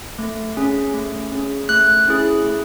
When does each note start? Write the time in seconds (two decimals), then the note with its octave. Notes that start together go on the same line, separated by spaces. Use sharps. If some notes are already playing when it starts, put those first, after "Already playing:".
0.19 A3
0.57 C#4 G#4
0.94 A3
1.32 C#4 G#4
1.69 A3 F#6
2.08 C#4 E4 G#4
2.44 A3